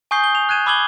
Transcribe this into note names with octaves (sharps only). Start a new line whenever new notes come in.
G#5 C#6 D#6 G6 C7 G7
G7
F7
F#6 G#6 D#7 E7
B5 D6 E6 G#6 F#7 G7